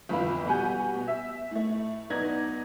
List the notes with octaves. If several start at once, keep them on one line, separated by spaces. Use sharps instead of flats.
G1 F2 E3 F4 B5
B2 G3 G4 F#5 G#5 G6
B2
E5
A2 A3
B1 B3 D#4 D5 G#6 A#6